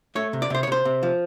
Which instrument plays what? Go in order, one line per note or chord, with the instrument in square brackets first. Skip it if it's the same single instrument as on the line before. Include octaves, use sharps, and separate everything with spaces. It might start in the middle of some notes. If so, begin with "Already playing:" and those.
[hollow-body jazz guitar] A3 C#5
C3
D5
C3 C5
C#5
C3 C5
C3
F3